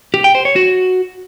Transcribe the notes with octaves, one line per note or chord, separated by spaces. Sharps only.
G4
G5
C5
C#5
F#4